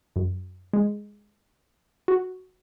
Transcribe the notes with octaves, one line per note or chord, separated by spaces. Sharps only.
F#2
G#3
F#4